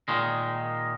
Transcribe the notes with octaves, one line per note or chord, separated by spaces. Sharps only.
A#2 D#3 G#3